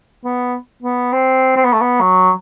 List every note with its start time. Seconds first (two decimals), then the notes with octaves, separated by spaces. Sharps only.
0.24 B3
0.83 B3
1.13 C4
1.56 C4
1.64 B3
1.73 A3
1.81 B3
2.00 F#3